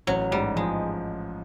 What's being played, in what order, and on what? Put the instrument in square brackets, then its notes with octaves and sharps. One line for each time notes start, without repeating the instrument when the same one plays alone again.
[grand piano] A1 [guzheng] F#3
[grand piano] G#2 [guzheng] G3
[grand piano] F3 [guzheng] G#3